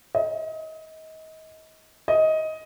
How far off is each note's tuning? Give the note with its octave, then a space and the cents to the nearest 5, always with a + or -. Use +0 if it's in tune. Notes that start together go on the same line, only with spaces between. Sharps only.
D#5 +30
D#5 +15